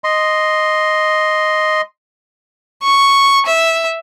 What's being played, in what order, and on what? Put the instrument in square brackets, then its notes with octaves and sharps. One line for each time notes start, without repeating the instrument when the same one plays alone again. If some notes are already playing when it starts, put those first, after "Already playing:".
[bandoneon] D#5 C6
[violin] C#6
E5